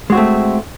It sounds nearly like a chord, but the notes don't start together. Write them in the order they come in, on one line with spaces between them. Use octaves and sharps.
G#3 F#4 C4 A3